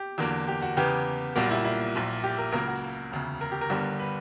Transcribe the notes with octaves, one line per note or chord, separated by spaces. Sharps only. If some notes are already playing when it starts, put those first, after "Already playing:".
Already playing: G4
E2 D3 F#3 A#3
G4
F#4
E2 C#3 E3 B3 G4
B1 A#2 G3 A#3 F#4
E4
E4
A#1 A#2 F#3
G4
A#4
C#2 C#3 F#3 A#3 A#4
F#4
E1 D2 C#3
A#4
G4
A#4
G1 G2 D3 G3
B4